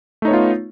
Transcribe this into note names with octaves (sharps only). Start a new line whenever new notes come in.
A3 B3 D#4 F4 C#5